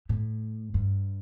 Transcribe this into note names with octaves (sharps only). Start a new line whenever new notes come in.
A2
G2